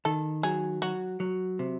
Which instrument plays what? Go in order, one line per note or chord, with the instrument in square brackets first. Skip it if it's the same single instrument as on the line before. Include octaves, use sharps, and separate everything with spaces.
[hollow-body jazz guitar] D#3 [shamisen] A4
[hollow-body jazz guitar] F#3 [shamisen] G#4
[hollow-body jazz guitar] F#3 [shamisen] F#4
[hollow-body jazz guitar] F#3
C3